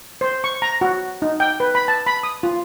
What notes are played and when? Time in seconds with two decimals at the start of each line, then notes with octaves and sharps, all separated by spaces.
0.21 C5
0.44 C#6
0.62 A#5
0.81 F#4
1.22 D#4
1.40 G5
1.60 B4
1.75 B5
1.88 A5
2.07 B5
2.23 D#6
2.43 F4